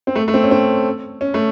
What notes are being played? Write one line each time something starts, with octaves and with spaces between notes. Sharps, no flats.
C4
A3
A3
C4
C#4
C4
C#4
A3